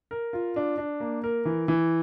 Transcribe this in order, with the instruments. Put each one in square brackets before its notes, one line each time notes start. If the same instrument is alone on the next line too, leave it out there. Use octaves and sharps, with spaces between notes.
[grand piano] A#4
F4
D4
D4
A#3
A#4
E3
E3